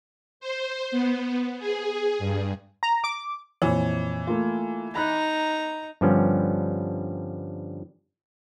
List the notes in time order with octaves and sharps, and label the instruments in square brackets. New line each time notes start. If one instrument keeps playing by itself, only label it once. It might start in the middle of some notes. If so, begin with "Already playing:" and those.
[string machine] C5
B3
G#4
G2
[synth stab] A#5
D6
[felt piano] F2 A#2 C#5 [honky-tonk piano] E3
[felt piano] A3 A#3 F4
[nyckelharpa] D#4 A#5 [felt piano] B5 F#6
[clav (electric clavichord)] G2 D3 F3 G3 B3 C#4